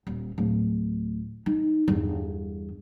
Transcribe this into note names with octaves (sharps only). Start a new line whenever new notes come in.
D#1
D1
D#4
G1 E2